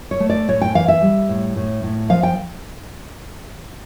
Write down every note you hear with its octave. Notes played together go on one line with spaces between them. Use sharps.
C#5
A3
D5
A2 C#5
G5
E3 F5
E5
G3
A2
A2
A2
F3 F5
G5